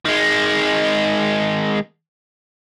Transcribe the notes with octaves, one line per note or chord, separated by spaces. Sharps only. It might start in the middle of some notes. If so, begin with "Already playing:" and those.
D#3 G#3